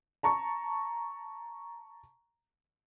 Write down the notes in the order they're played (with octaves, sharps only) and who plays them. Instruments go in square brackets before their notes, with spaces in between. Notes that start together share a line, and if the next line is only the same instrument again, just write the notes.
[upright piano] A5 A#5 C#6